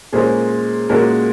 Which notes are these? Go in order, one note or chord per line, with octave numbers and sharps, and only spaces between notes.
A#2 G#3 C#4 G#4 C5
A#2 G#3 C#4 F#4 A#4